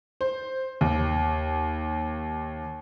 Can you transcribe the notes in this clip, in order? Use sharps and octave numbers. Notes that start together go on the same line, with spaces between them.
C5
D#2